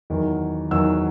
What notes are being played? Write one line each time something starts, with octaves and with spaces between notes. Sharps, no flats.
E2 D#3 F#3
E2 D#3 F#3 E6